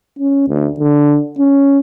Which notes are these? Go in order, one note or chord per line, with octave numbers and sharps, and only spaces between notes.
C#4
D2
D3
C#4